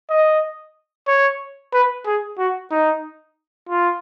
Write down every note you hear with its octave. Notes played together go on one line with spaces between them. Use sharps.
D#5
C#5
B4
G#4
F#4
D#4
F4